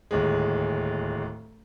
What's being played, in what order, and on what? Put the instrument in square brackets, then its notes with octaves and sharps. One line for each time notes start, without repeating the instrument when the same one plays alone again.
[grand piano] D1 D#2 G#3